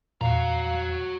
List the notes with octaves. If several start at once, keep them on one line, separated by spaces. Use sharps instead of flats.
E2 A#2 F#4 F5 A#5